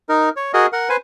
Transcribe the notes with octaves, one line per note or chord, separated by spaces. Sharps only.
D#4 A#4
C#5
F#4 G#4 A#4 D#5
A#4 F#5
B4 C5 G#5